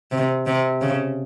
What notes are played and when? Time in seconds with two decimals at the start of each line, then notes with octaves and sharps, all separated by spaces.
0.12 C3
0.46 C3
0.82 C#3